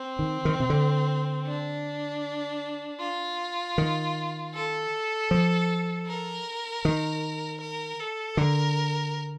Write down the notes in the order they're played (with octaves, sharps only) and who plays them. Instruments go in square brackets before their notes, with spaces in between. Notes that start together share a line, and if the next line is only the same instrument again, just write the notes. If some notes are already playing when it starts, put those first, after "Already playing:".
Already playing: [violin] C4
[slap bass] D#3
D#3
C3
D3
[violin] D4
F4
[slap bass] D#3
[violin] A4
[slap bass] F3
[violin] A#4
[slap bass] D#3
[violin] A#4
A4
[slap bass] D3 [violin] A#4